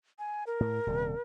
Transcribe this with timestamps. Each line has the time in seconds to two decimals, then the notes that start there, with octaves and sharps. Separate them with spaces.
0.19 G#5
0.47 A#4
0.60 A2
0.87 D#1 C3 G3